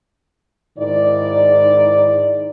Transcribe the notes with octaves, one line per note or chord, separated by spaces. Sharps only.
G#2 D#3 E4 D5